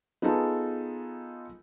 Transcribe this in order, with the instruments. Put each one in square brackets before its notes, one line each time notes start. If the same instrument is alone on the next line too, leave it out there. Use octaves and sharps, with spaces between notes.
[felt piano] B3 D#4 F4 G#4 A4